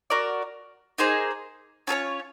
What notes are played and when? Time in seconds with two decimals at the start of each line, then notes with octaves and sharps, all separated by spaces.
0.10 F#4 A#4 D5
0.98 A#3 D#4 G#4 C5
1.87 C#4 F4 A4 C#5